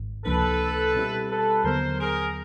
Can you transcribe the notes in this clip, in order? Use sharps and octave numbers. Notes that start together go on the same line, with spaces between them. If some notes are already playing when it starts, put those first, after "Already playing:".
Already playing: G#1 G#2 D#3
C#2 C3 F3 A#3 D4 A4 B4
B2 G3 C4 E4 G4
A4 B4
D#2 D3 F#3 B3 A#4 C5
G#4 A#4